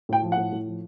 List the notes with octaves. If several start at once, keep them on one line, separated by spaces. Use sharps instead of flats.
A2 G5
F3
F#5
A2
A2
F3